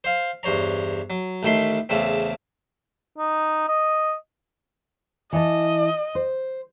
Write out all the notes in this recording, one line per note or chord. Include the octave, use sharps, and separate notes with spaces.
C5 F5
E2 G2 C5 C#5 A#5
F#3
A1 A2 D#3 A3 C6
E2 C#3 A3 C4
D#4
D#5
E3 D#5 A5
C5